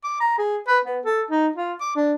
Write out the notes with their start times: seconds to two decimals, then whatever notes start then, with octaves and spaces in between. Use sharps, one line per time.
0.04 D6
0.20 A#5
0.38 G#4
0.67 B4
0.85 B3
1.05 A4
1.31 D#4
1.56 F4
1.80 D6
1.96 D4